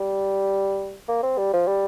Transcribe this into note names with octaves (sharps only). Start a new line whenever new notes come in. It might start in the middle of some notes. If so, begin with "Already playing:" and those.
Already playing: G3
A#3
C4
G3
F3
G3